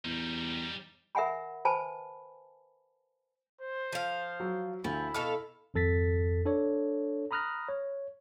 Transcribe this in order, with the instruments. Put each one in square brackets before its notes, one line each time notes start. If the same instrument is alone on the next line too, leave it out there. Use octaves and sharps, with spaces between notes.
[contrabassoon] E2 [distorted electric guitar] G3 D#4
[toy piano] A#4 E5 F#5 G#5 B5
B4 C5 G#5 A5 B5
[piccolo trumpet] C5
[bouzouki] F3 F5
[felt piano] F#3
[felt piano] D2 [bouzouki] F3 [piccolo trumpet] E4
[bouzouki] B2 A4 F5 [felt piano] F6
[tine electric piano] G#1 F2 A4 A6 B6
D4 A4 C#5
A#5 B5 D#6 F6 F#6 A#6
C#5